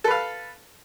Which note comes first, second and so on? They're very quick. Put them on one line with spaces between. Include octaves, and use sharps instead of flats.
A4 B4 F5